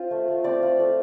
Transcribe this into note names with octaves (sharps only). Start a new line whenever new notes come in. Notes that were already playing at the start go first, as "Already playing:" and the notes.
Already playing: C4 F4 C5
A3
A3
C4 D5
F4
A3